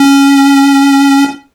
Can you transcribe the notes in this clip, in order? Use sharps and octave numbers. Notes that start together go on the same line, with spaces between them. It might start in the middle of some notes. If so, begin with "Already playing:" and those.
Already playing: C#4